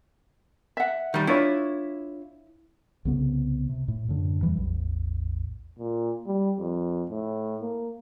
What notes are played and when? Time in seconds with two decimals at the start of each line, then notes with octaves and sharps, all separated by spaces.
0.77 E5 F#5
1.14 D#3 G3
1.27 D4 E4 F4 C#5
3.05 C2 C#3 B3
3.69 C3
3.88 A2
4.08 F#2 A2 D3
4.42 E2 E3 F#3 G3
4.57 A1 E2
5.79 A#2
6.27 G3
6.60 F2
7.10 A2
7.62 A#3